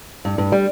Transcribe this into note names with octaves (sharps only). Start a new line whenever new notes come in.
G2
G2
G3